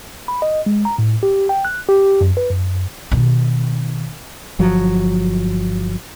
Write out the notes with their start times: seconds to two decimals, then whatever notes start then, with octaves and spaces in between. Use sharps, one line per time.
0.28 B5
0.42 D#5
0.66 G#3
0.85 A#5
0.98 A2
1.23 G4
1.49 G5
1.65 F#6
1.89 G4
2.21 F#2
2.37 B4
2.51 F#2
3.12 B2 D#3
4.59 G1 F3 F#3